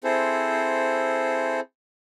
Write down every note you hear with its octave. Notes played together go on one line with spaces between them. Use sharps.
C4 E4 G#4 A4 C5